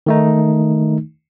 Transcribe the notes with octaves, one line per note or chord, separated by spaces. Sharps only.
D#3 A3 D#4